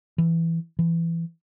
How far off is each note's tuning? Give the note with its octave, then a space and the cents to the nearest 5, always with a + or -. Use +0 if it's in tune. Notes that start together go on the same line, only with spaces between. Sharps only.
E3 +5
E3 +20